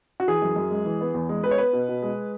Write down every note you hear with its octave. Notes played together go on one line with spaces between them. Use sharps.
F#4
E3 G#4
F#2
F#2
G#3
E3
B3
E2
G#3
B3 B4
C#5
B3 B4
B2
B2
G#3